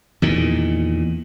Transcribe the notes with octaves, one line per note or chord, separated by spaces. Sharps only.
E2 A#2 D#3